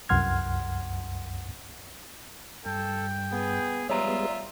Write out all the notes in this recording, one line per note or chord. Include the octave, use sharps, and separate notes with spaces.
C2 F#2 F#5 C6 F6 G#6
G2 A4 G5
B3 G#4
G3 G#3 B3 F4 C#5 D5 E5 A#5